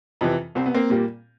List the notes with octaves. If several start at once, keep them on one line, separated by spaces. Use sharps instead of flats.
F2 C3 E3
C2 C4
B3
A#3 C4
A#2 G3 A#3